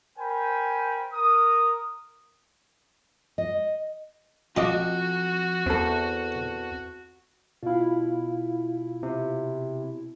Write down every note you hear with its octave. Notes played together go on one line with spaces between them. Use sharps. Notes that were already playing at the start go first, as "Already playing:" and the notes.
A#4 C5 G5 G#5 B5
A#4 D#6
D#5
F2 F4 F#4 D#5 D6
E2 C4 A4
B2 E4 F4 F5
C3